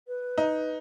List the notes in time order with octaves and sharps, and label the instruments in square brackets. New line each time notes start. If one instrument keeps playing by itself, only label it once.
[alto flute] B4
[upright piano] D#4